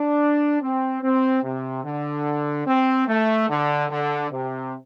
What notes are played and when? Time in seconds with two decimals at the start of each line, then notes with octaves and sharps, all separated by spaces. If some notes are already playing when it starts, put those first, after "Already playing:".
Already playing: D4
0.62 C4
1.03 C4
1.44 C3
1.84 D3
2.67 C4
3.08 A3
3.49 D3
3.90 D3
4.31 C3